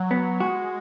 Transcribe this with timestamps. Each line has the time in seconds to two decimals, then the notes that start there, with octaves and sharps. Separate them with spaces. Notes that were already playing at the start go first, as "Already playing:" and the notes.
Already playing: F#3
0.11 B3
0.40 G#3 F#4